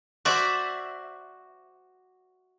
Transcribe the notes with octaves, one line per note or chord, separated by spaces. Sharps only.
F#4 C5 D5 E5